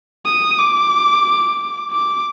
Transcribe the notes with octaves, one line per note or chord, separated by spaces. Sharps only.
D#6
D6
D6